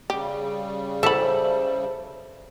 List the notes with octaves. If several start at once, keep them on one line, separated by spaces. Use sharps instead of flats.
C#3 G3 G4
E3 A4 C5 E5 A5 B5